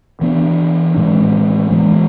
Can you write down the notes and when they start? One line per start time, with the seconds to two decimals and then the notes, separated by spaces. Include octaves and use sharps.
0.21 E3 B3 D4
0.96 A2 E3 G#3
1.71 E3 G#3 B3